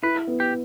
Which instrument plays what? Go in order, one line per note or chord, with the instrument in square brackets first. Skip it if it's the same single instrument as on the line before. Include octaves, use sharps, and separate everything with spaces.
[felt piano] E4 [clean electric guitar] B4
[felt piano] B3
[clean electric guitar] G4